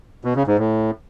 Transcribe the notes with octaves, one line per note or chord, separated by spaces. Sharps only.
B2
C#3
G#2
A2